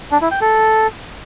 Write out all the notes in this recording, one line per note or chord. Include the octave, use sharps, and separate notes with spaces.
D4
E4
G5
A4